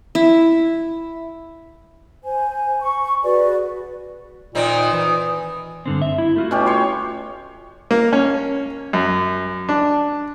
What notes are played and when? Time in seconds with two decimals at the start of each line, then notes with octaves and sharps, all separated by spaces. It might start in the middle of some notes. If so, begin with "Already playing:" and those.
0.15 E4
2.24 C5 G#5
2.81 C#6
3.23 F#4 G#4 B4 D5
4.55 A#2 D#3 C4
4.93 E3
5.86 G2 D3 C4
6.02 E5
6.18 E4
6.36 A3 F4 F#4
6.51 B2 C#4 G4
6.66 C#5 C6
7.91 A#3
8.13 C#4
8.93 F#2
9.69 D4